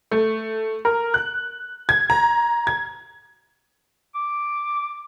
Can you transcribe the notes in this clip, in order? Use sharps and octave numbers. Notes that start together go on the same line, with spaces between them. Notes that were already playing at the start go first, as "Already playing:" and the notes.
A3
A#4
F#6
G#6
A#5
G#6
D6